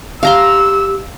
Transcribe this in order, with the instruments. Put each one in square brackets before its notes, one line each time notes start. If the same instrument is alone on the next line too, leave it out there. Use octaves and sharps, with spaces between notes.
[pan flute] G4 [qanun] F5 A#5 C6 [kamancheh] E6